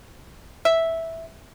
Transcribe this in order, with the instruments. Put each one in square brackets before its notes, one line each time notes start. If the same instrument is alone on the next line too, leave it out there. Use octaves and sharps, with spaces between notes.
[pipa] E5